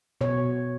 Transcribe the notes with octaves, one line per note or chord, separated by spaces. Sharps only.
B2 C#5